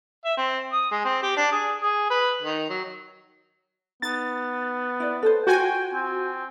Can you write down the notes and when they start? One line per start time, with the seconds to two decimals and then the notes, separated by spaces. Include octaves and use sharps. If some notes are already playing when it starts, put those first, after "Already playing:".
0.25 E5
0.37 C4
0.72 D#6
0.91 G#3
1.05 C4
1.23 G4
1.37 D4
1.52 G#4
1.81 G#4
2.10 B4
2.42 D#3
2.69 F#3
4.02 B3 D#4 A6
5.00 E4 D5
5.23 A4 B4 C5
5.47 F4 F#4 C5 G5 G#5
5.94 C4